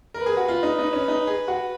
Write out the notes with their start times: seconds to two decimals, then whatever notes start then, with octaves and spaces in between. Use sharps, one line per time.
0.14 A#4 B4
0.26 G#4
0.37 F#4
0.48 F4
0.63 D#4
0.79 D#4
0.93 C#4
1.08 D#4
1.27 G#4
1.48 F#4